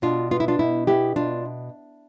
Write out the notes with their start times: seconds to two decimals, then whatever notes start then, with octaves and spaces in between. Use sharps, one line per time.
0.02 B2 D4 F4
0.31 B3 F4
0.40 E4
0.48 D4 F4
0.59 B2 E4
0.87 B3 E4 G4
1.16 B2 D4 F4